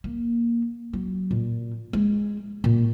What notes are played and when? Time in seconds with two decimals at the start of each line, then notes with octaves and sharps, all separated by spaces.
0.04 A#3
0.93 F#3
1.31 A#2
1.93 G#3
2.64 A#2